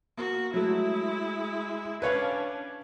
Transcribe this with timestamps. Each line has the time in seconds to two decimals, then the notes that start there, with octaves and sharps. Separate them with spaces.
0.18 A#3 F#4
0.54 F#3 G#3 A3 E4
2.02 C#4 D4 B4 C#5 F5